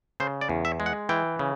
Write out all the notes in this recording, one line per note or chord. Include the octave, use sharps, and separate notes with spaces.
C#3 C5
D5
E2
E5
G#3
F#5
E3 G5
C#3